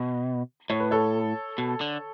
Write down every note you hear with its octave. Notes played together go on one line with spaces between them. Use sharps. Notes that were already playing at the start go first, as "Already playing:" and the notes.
Already playing: B2
A2 C#5
B4
A4 C#5
B2
D3